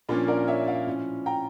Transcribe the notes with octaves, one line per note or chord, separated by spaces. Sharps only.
A#2 F3 A#3 C#4 D4 F4
A#4 D5
C#5 E5
D5 F5
A2 F3 C#4
G5 A#5